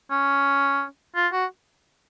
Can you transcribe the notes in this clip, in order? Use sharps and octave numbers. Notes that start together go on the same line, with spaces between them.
C#4
F4
F#4